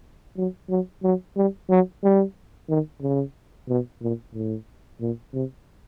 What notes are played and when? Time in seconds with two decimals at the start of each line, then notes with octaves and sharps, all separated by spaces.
0.37 F#3
0.69 F#3
1.03 F#3
1.37 G3
1.70 F#3
2.03 G3
2.69 D#3
3.01 C#3
3.69 B2
4.02 A#2
4.35 A2
5.01 A#2
5.34 C3